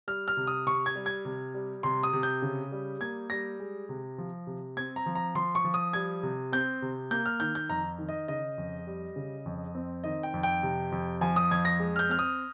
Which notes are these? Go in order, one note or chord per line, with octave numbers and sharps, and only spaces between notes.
G3 F6
F6
C3
D#6
C3 C#6
G#6
G3
G#6
C3
G3
C3 C6
D#6
C3
G6
C#3
G3
A#3 G#6
G3 A#6
G#3
C3
F3
C3
C4 G#6
A#5
F3
A#5
F3 C6
C#6
F3
D#6
G3 G#6
C3
C4 G6
C3
A#3 G6
F6
D#3 G6
G6
F2 A#5
D#3
D#5
C#3 D#5
F2
G3
C#3
F2
C4
D#3 D#5
G5
F2
G5
C3
F2
F3 G#5
D#6
F2 G#6
A#6
G#3
F6
G6
C4 F6
D#6